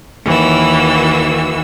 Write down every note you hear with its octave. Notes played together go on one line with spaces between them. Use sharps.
D#2 E3 F#4 E6